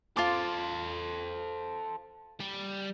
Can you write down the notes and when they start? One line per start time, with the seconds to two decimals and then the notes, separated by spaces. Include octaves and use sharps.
0.17 F4 A4 C5 A5 D6
2.40 G3